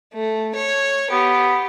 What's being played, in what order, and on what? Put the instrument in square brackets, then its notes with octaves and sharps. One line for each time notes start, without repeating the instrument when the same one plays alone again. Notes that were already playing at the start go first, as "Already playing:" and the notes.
[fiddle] A3
C#5
[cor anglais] B3 [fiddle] G4